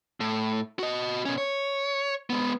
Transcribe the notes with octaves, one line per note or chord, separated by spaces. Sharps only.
A2
F#4 D#5
B2 C#4
C#5
G#3 B3